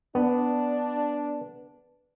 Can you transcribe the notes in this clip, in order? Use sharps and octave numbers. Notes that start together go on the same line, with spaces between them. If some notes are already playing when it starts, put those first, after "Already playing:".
B3 D4